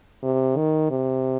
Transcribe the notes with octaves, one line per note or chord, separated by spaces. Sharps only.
C3
D#3
C3